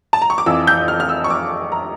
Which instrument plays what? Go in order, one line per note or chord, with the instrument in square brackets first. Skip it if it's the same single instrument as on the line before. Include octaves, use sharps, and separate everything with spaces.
[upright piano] A5
A#5
C#6
D6
F2 E3 E6
G6
F6
F6
E6
C#6
D6
A#5